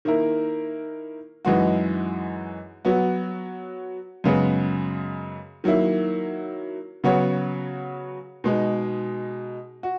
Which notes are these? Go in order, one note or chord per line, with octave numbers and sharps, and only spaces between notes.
D#3 A#3 E4 A#4
F#2 E3 G#3 D#4 F#4
F#3 B3 F#4
F#2 C#3 G#3 B3
D#3 F#3 A#3 E4
C#3 F#3 B3 F#4 C#5
B2 G#3 D#4
F#4